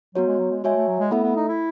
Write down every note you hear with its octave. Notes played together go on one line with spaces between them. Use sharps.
F#3 B3 F#4 C#5
G#3
F#3
G#3
G#3 F#4 C#5 E5 G#5
A3
F#3
G#3
A3 B3 E4 A4 E5
B3
D#4
E4